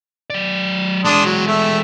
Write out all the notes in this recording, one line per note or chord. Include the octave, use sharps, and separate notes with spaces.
F#3 D5
E3 G#3 D4 C6 D#6
F#3
A3 E5